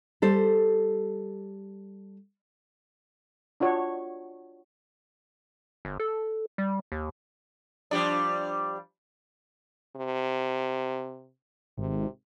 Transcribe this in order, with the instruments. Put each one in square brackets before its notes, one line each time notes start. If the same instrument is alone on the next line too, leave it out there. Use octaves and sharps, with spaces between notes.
[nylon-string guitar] G3 A4 C5
[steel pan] D4 F4 F#4 C#5
[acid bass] G1
A4
G3
D#2
[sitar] F3 G3 D4
[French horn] C3
[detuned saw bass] G#1 [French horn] C3